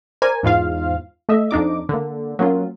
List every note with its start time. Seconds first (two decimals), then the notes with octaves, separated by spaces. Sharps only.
0.22 A#4 C5 D5 G#5
0.43 E2 G#2 F4 F5
1.29 A3 D#5 E5
1.51 F2 D4 D#4 D6
1.89 D3 A#3
2.39 F#3 A#3 C#4 F4